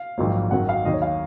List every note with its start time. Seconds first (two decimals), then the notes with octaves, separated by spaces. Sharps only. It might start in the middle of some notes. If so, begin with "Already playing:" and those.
Already playing: F5
0.18 A#1 G#2 D#3 F#3
0.51 G#1 F#2 D#3 F#3 F#5
0.69 F5
0.85 D#2 D#3 F#3 D#5
0.93 C#5
1.02 F5